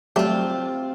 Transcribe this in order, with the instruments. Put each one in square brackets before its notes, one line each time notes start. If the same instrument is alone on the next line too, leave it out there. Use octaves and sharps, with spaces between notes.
[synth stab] F#3 G3 A3 [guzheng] C4 F4